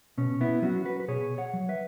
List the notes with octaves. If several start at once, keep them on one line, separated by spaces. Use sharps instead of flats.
B2 C#4
B3 E4
F#3 C#4 F#4
F#4 B4
B4
B2 G#4 C#5
C#5 F#5
F#3
B4 E5